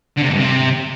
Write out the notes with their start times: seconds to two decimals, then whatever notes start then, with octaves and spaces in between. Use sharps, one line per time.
0.17 D3
0.22 C3
0.28 G#2
0.34 G2
0.39 C3